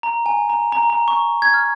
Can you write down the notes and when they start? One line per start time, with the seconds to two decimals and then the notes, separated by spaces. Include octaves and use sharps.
0.03 A#5
0.26 G#5
0.49 A#5
0.72 A#5
0.90 A#5
1.08 C#6
1.42 G#6
1.54 F6